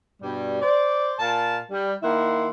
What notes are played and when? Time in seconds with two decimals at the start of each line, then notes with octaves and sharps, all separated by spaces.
0.22 G2 B2 G3
0.62 C5 D5
1.19 A#2 F5 A5
1.71 G3
2.03 D#3 A#3 E4 F#5 C6